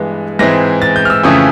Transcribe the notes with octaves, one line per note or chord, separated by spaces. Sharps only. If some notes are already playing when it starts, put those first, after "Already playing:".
Already playing: G2 E3 G#3 B3
G#2 E3 G#3 C4 E4 A#6
A6
G6
F6
E6
F2 C#3 E3 A3 C#4 D#6